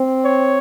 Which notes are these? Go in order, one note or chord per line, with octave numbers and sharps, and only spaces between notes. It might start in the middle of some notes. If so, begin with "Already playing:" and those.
Already playing: C4
C#5